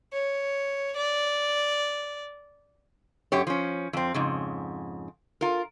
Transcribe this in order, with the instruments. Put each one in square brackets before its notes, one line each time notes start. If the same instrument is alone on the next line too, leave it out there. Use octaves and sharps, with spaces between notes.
[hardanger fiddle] C#5
D5
[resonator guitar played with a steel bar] F#2 G4 C#5
F3 C#4
F2 C4
F2 G#2 C#3
F4 A#4